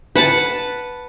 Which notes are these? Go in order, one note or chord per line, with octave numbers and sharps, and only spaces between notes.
B4 F#5 A5